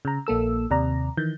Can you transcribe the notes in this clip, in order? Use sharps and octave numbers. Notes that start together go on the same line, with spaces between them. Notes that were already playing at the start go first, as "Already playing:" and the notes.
C#3 A#5
A#1 A#3 A4 E6
D#2 C3 D5 A#5
D#3 E3 G6